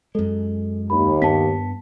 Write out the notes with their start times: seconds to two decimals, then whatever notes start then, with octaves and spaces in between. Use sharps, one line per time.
0.15 F#2 G#3 A4
0.90 D#2 B5
1.22 G2 B3 A5 B6